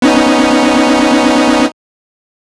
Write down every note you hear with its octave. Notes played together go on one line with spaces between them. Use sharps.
B3 C#4 D#4